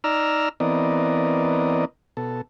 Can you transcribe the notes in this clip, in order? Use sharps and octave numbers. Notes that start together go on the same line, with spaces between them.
D#4 D5 A#5 E6 F6
E3 B3 C4 A#4 D5 D#5
B2 A4